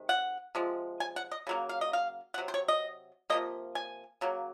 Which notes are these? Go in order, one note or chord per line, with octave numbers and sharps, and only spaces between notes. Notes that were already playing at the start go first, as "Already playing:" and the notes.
Already playing: C3 D#3 G#3
F#5
C3 F3 G#3
G#5
F#5
D#5
C#3 F#3 A#3
F5
D#5
F5
F#5
C3 F#3
C5
C#5
D#5
C3 F3 A#3 D#5
G#5
C#3 F#3 A#3